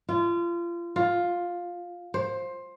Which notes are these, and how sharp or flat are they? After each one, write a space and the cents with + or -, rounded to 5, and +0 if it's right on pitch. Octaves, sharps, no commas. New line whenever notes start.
F4 -30
F4 +10
C5 +15